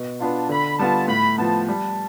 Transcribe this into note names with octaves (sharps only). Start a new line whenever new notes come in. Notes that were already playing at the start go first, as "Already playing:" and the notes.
Already playing: B2
B3 D4 F4 A5
D3 B5
G3 B3 F4 A5
A2 B5
F3 B3 A5
G3 A5